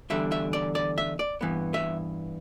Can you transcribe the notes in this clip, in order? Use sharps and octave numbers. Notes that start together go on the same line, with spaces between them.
E2 D3 G3 E5
E5
D5
D5
E5
D5
G2 E3 B3
E5